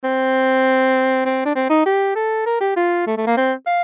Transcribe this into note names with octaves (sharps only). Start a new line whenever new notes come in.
C4
C4
D4
C4
D#4
G4
A4
A#4
G4
F4
A3
A3
A#3
C4
F5